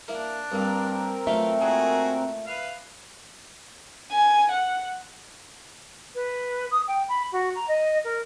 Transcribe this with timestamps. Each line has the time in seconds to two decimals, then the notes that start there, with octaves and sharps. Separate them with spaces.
0.08 A#3 D4 E4 A#4
0.52 G2 A#3 C4 A#4
1.27 E3 F#3 A3 F4 E5
1.61 A#2 E4 F#4 G#4
2.46 B4 E5 F5
4.12 G#5
4.51 F#5
6.15 B4
6.71 D#6
6.87 G5
7.08 B5
7.31 F#4
7.55 A#5
7.68 D#5
8.04 A#4